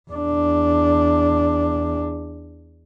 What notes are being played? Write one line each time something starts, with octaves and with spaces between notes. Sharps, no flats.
E2 D4